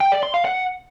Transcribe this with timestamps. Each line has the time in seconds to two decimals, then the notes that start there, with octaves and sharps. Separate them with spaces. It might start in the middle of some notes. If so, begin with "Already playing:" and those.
0.01 G5
0.12 D5
0.23 C6
0.34 F5
0.45 F#5